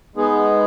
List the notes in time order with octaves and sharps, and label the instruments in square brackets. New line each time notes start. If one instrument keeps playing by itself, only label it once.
[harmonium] G#3 B3 D#4 G#4